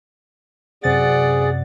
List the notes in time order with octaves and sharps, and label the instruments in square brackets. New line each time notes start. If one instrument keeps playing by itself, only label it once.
[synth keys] F#2 C3 A6 [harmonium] G#4 [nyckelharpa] D5 F#5